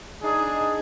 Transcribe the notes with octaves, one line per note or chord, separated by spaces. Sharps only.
D4 D#4 G#4